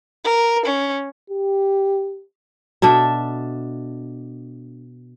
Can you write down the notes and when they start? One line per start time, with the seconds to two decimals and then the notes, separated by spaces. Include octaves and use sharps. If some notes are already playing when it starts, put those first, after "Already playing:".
0.24 A#4
0.65 C#4
1.30 G4
2.82 B2 D4 A4 E5